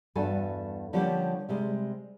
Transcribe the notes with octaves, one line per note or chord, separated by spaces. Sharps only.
E2 G2 F#4 A4 G#5
D3 F3 G3 A#3 C#4 G4
C3 G3 G#3